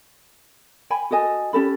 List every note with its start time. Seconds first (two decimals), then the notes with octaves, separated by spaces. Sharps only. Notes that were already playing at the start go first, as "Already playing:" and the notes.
0.90 G5 G#5 B5
1.11 F#4 A4 D#5 G#5
1.53 C#4 G4 A4 B5